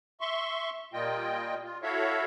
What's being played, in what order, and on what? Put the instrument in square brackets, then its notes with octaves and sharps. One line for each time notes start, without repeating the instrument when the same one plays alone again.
[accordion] E5 C6 C#6
A#2 G3 A#3 F4 D#5 G5
F4
E4 F#4 A4 C#5 E5 F5